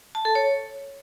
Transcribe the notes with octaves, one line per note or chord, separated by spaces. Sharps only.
A5
A4
C#5